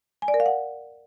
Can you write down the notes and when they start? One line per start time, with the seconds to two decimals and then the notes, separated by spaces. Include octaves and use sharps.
0.22 G#5
0.28 D5
0.34 A#4
0.40 F5
0.46 F#5